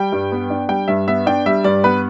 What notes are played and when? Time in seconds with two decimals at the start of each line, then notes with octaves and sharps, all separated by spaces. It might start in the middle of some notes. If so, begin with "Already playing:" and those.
Already playing: G3 G5
0.12 G2
0.32 B3
0.50 D4
0.69 G3 G5
0.88 G2 E5
1.07 B3 E5
1.26 D4 G5
1.46 G3 E5
1.64 G2 D5
1.84 B3 B4